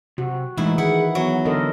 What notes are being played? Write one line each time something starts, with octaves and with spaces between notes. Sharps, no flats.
C3 F#4
A2 E3 G#3 A3 D#4 E4
D#3 E4 G#4 F#5
F#3 B3
D3 A4 A#4 D#5